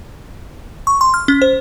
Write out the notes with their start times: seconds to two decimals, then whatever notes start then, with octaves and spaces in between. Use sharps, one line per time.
0.87 C#6
1.01 C6
1.14 F6
1.28 C#4
1.42 C5